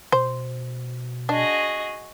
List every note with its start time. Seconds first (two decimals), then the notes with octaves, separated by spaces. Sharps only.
0.12 B2 C5
1.29 D4 F#4 G#4 D#5